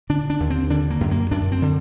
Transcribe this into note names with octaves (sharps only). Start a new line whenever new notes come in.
D3 D4
D4
D#2
C4
D3 D4
A#3
F#2
A#3
F#2 D4
C4
D3